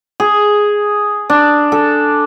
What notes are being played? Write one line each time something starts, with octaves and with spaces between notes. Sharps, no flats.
G#4
D4
A4